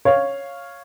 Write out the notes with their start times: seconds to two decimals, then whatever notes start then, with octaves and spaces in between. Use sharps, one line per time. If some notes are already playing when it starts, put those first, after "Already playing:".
0.05 C#5 F5